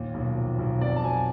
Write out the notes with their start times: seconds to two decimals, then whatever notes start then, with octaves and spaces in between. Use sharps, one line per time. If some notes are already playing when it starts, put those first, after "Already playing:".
Already playing: D#2 A#2
0.14 B1
0.36 F3
0.59 B1
0.81 F2 D5
0.96 A5
1.03 F#3 G#5